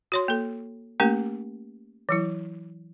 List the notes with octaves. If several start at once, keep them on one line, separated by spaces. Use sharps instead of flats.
F#4 C#5 C6
A#3 A4
A3 A#3 C#4 G4 A#4
E3 F#3 E4